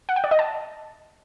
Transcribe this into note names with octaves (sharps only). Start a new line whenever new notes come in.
F#5
G5
D5
D#5
A5